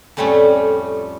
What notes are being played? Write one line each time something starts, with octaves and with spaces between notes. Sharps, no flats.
F2 A2 G3 A3 C#4